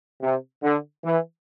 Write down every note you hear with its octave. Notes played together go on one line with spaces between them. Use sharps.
C3
D3
E3